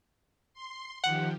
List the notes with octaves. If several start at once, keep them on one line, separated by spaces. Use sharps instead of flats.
C6
D#3 F3 G4 F#5